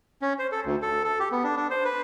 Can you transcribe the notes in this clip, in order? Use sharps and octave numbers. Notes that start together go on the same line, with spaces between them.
C#4
C5
A4
D2
A4
A4
G4
B3
D4
D4
C5
B4